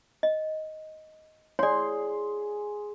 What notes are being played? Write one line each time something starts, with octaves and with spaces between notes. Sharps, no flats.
D#5
G#4 C#5 D5 C6